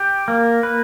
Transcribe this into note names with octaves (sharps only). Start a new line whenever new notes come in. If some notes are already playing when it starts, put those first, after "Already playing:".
Already playing: G4
A#3
B4